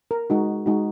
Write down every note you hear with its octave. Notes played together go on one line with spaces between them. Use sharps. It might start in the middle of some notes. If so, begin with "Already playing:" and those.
A#4
G#3 D#4 F#4
G#3 D#4 F#4